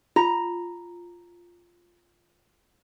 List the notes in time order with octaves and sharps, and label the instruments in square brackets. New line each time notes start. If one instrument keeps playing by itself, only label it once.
[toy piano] F4 [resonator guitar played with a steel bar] A#5